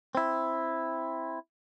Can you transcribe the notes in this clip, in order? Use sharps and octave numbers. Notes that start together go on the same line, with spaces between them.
C4 E4